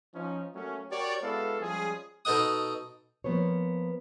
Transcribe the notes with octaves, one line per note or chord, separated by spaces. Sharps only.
F3 C#4 D#4
F#3 A3 A#3 C#4
F#4 G4 A#4 C#5 D5
G#3 B3 E4 F#4 A4 F5
F3 G3 G#3 C#4 G#4
B2 D#4 A4 D#5 F#5 D#6
F3 A#3 B3 C5 C#5